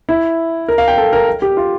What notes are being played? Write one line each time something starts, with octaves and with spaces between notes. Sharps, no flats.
E4
A#4
F5
G5
A4
A#4
G4
F4